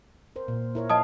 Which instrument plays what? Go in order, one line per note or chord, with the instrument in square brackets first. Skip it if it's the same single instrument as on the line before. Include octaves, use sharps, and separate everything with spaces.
[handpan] A#4 C5
A#2
E4 A#4 C#5
[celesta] D#5 A5 D#6 [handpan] F5